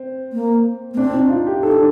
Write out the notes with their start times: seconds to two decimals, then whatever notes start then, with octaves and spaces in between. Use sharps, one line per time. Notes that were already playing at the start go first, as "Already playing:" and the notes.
Already playing: C4
0.33 A#3
0.94 A#3
0.97 C4 D4
1.14 D#4
1.30 F4
1.47 G4
1.63 D#4 A4
1.72 D4